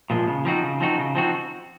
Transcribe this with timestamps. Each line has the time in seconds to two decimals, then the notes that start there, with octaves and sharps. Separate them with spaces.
0.10 A#2 F3 G#3
0.27 C#3
0.45 F3 C4 D#4 F#4
0.63 C#3
0.80 F3 C4 D#4 F#4
0.98 C#3
1.15 F3 C4 D#4 F#4